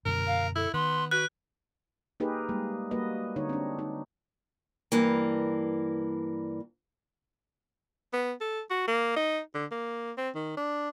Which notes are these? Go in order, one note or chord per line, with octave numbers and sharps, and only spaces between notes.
F#2 B2 D3 A#4
F5
E4 A4
D#3 B3 C6
F#4 B4 F#6
A#3 D#4 G4 G#4 A#4 B4
G3 G#3 A#3
G3 A#3 F#4 B4 D#5
D3 D#4 C#5
C4 D4
D#4
G2 E3 A#3
B3
A4
F#4
A#3
D#4
D3
A#3
C4
D#3
D4